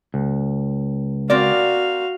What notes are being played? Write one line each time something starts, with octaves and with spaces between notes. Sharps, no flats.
C#2
C4 F#4 A#4 D5 F5